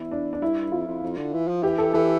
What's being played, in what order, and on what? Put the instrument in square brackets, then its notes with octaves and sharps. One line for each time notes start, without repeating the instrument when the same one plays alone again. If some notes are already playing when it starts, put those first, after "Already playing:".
Already playing: [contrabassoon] E2 [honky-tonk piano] E4
[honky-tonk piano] D4
D4
[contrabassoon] G2 [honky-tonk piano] E4
[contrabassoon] F2 [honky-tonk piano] F4
[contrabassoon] F2
F2
D3
E3
F3
[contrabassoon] E3 [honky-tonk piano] G4
[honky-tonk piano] A4
[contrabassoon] E3 [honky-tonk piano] A4